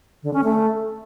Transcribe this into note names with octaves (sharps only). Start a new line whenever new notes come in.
D3
C#4
A3